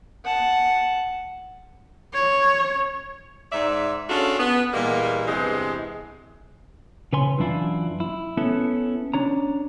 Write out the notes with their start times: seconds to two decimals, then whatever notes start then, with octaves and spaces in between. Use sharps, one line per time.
0.25 F#5 A5
2.14 C#5
3.52 G#2 D#4 D5 E5
4.10 C#4 D4 F4 F#4 G#4 A4
4.39 B3
4.73 A#2 E3 G3 G#3 A#3
5.27 E2 G2 C3 E3 G#3
7.13 C#3 B4 C#5 G#5 C6
7.38 F#2 E3 F#3 D4 E4 F4
8.00 E4
8.37 B3 C#4 E4 A4
9.14 C#4 D4 C#5 A#5